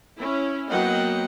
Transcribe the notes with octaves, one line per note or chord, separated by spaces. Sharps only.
C#4 E4
F#3 A#3 B3 D#5 F#5 G5